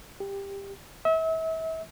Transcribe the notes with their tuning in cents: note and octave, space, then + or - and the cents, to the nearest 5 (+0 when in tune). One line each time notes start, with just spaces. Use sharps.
G4 +15
E5 -35